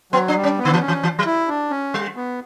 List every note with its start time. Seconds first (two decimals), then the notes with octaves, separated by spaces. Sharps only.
0.12 F#3 B3
0.28 D4
0.36 G3
0.43 C#4
0.58 B3
0.65 D3
0.73 E3
0.80 C#4
0.88 E3
1.03 E3
1.19 F#3
1.26 E4
1.48 D4
1.71 C#4
1.94 G3
2.16 B3